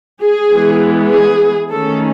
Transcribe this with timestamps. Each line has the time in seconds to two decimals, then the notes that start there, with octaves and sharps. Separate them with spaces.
0.20 G#4
0.50 E3 G#3 B3
1.10 G#4
1.71 D#3 A3 C#4 A4